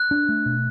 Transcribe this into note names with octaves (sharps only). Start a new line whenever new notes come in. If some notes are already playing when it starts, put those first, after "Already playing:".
Already playing: F#6
D4
A3
B2